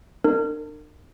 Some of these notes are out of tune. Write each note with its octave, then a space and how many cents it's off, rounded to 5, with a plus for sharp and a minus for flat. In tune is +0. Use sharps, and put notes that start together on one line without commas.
D4 +40 A#4 -35